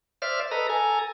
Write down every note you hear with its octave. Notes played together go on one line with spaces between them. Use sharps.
C5 D5 E5 F6
A4 B4 D#5 A#5
A4 G#5 A#5